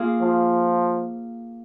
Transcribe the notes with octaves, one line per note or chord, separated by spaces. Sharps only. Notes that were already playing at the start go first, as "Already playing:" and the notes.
Already playing: A#3 F4 G#4
F3